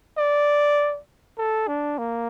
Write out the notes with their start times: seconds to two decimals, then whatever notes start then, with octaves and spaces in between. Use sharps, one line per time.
0.17 D5
1.38 A4
1.68 D4
1.98 A#3